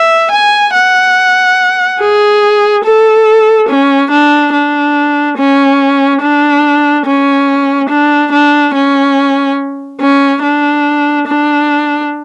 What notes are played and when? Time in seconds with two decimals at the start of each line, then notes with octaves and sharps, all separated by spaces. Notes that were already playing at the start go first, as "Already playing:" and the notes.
Already playing: E5
0.32 G#5
0.74 F#5
2.00 G#4
2.84 A4
3.69 C#4
4.11 D4
4.53 D4
5.38 C#4
6.22 D4
7.06 C#4
7.90 D4
8.32 D4
8.74 C#4
10.01 C#4
10.43 D4
11.28 D4